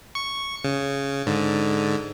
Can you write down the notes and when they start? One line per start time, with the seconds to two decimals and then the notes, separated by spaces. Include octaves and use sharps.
0.15 C#6
0.65 C#3
1.26 G#2 D3